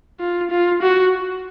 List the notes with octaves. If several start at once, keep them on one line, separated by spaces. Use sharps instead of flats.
F4
F4
F#4